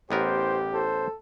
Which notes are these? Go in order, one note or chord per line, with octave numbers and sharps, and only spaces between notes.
A1 B3 G4 A#4 C5
A4 C5